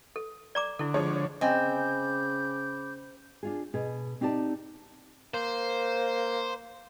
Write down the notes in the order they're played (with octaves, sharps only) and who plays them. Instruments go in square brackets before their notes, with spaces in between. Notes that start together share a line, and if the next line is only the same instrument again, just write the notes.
[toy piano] A4
D5 A#5 D6
[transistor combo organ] D3 [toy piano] E4 A4
[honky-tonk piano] F3 G#3 C#5
[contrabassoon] C#3 [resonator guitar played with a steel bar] C4 [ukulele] D#5 G#5 [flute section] B5 D6 G6
[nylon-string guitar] D4 F4 G#4
B2 G#4
C4 D#4 G4 D5 A5
[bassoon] A#3 [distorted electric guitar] C5